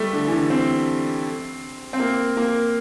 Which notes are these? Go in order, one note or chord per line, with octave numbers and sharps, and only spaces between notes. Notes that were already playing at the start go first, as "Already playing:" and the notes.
Already playing: G3 A3
D3
E3
D3
C4
C4
A#3
A#3